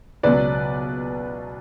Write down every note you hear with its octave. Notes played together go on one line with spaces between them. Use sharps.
C#2 B2 F#3 B4 D5